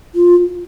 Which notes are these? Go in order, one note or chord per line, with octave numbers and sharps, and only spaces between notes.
F4